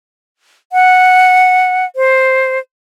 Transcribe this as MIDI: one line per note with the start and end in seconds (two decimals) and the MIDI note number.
0.73 1.85 78
1.96 2.59 72